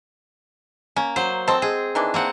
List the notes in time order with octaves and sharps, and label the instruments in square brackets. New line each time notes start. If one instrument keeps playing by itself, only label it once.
[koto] A#3 [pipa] C#4
[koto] F#3 C5
[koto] C4 A4 [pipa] C5 D#5 A5
[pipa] G#3 [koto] G#4
[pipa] D#3 E3 D4
[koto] A#3 C4 F#5